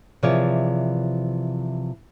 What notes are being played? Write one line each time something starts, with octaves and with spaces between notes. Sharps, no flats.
C3 E3 F3 G#4 C#5 D5